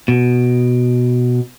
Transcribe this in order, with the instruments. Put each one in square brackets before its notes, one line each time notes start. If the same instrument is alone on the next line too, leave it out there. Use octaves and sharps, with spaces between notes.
[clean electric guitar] B2